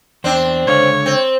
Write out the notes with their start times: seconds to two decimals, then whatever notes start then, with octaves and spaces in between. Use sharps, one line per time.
0.24 E2 C4 D4 C5 G5
0.67 C#2 D3 C#5 F5
1.06 C4